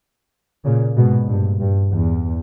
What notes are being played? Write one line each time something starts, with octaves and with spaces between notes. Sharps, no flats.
A#2 C#3
G#2 B2
G2 A#2
G2
E2